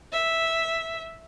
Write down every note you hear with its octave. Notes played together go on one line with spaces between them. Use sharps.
E5